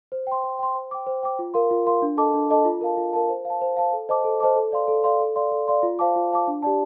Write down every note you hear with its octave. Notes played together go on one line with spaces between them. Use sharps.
C5
G5 C6
C5
G5 C6
C5
G5 D6
C5
G5 D6
F4
A#4 F5 C6
F4
A#4 F5 C6
D4
A4 D#5 A5 D6
D4
A4 D#5 A5 D6
F4
A#4 F5 A5
F4
A#4 F5 A5
C5
F5
A5
C5
F5 A5
A4
C5 D#5 A5 D6
A4
C5 D#5 A5 D6
A4
D5 F5 C6
A4
D5 F5 C6
A4
D5 F5 C6
A4
D5 F5 C6
F4
C5 F5 A5 D6
F4
C5 F5 A5 D6
D4
G4 D5 A5